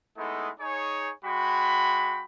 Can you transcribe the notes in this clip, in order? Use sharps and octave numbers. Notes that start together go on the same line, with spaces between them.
G#3 A3 B3 D#4 E4 A4
D#4 G#4 C#5
G#3 F#4 G5 B5